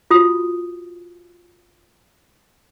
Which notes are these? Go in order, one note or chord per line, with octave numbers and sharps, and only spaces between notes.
F4 F#4 D#6